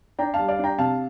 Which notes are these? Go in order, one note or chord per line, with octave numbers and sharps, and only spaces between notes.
D4 G5 A#5
F5 A5
G3
D5 F5
D4 G5 A#5
C3 F5 A5